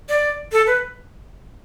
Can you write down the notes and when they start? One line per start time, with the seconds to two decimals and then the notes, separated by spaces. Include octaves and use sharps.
0.09 D5
0.52 A4
0.67 B4